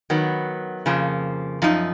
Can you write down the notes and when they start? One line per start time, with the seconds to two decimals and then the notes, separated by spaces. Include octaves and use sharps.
0.10 D#3 F#3 B3
0.86 F2 C#3 F3 A#3
1.62 F#2 F3 D#4